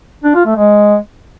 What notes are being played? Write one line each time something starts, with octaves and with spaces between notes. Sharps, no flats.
D4
F4
A3
G#3